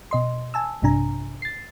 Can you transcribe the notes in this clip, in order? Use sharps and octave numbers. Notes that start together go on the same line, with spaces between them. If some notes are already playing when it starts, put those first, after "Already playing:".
B2 D#5 C6
G#5 A5 E6
A#1 G2 C3 D4 G#5 A#5
A6 C7